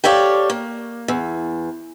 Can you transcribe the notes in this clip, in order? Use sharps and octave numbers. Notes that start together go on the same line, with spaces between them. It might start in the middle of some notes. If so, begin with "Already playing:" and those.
G4 A4 C#5 D5 F5
A#3
E2